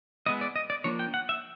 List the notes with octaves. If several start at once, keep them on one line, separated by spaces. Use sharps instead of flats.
G#3 B3 E4 D#5
D5
D#5
D5
F3 A#3 D4 C#5
G5
F#5
E5